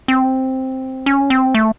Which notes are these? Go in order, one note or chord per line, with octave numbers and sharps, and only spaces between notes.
C4
C#4
C4
A3